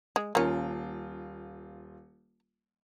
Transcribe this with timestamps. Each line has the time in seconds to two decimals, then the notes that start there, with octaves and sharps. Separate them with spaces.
0.16 G#3
0.35 D#1 A#3 C#4 F4